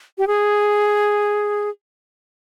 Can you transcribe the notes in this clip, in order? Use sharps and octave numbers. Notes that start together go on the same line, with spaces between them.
G4
G#4